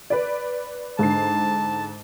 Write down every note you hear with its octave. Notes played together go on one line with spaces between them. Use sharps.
B4 D5
G#2 D3 A5 C7